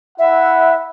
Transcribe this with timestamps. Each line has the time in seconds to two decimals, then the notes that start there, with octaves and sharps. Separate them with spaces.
0.19 E4 E5 F#5